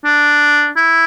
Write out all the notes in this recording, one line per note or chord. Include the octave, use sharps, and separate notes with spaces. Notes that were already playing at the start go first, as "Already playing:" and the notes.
D4
E4